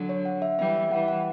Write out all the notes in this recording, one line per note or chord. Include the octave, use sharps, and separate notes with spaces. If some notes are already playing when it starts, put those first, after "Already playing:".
Already playing: D3 F#3
C#5
F#5
E5
E3 G3 E5
E5
E3 G3 F#5
F#5